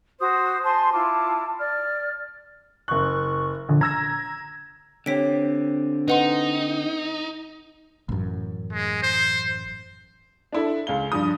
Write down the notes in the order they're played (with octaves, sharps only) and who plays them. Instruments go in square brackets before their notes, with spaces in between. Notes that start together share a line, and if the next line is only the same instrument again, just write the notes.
[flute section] F#4 C5 D#6
C5 G#5 A5 C6
E4 F4 A5 D6
D5 F6
[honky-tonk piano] F#1 F#6 [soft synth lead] C#6
[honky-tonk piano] A#1 [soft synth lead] D3
[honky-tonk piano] A#5 E6 A#6 [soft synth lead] G#6
[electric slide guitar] D3 C4 G4 [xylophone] C#5 B6 D7
[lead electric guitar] D#4 [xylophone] B4 F#5 C6
[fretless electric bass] A1 F#2
[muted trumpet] G#3
C5
[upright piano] D4 E4 A4
C#2 F5 G7
G2 F3 D#6